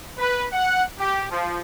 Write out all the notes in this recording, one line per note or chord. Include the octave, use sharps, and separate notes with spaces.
B4
F#5
G4
F3